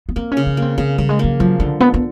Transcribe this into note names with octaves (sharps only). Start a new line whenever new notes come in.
B3
A#3 C4
C#4
C#3
C#4
A#3 C4
C#3 C4
C#3 G3
G#3
F#3 A#3
F3 F#3
D3 G3
D3 B3
B3